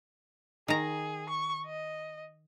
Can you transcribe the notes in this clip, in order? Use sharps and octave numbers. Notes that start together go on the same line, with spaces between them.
D#3 G#4 A#5
C#6
D#5